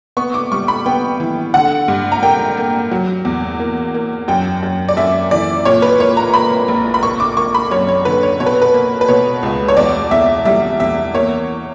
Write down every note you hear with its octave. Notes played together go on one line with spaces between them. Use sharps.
B3 C#6
D6
G3 C#6
B5
B3 G5
E3
D3 F#5
G2
A#5
A#3 G5
A#3
F#3
E2
A#3
A#3
F#2 G5
F#2
D5
F#2 E5
E3 D5
A#2 C#5
B4
A#3 C#5
A#5
A#3 B5
A#1
B5
A#3 C#6
D6
A#3 C#6
B5
F#2 C#5
C#5
D3 B4
C#5
B2 C#5
B4
B4
A#3
B4
B2 C#5
C#2
C#5
E2 D5
E2 E5
G3 E5
E2 E5
A#3 C#5